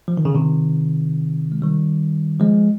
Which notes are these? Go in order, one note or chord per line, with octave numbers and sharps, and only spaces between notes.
F3
D#3
C#3
C3 D#3
G#3
D#3 G3
F3 G#3